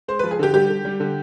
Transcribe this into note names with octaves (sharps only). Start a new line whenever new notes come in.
G#3 C5
F3 B4
G#4
D3 G4
G3 G4
D3
G3
D3